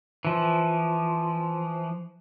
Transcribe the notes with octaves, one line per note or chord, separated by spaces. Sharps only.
E3 F3